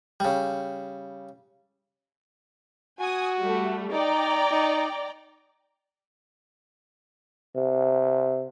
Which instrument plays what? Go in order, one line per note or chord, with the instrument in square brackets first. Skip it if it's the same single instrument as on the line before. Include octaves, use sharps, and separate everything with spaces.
[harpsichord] C#3 G3
[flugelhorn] F#4 [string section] G#5 D#6
[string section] G3 A3
[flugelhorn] D#4 [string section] D5 G5 A#5
[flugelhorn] D#4
[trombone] C3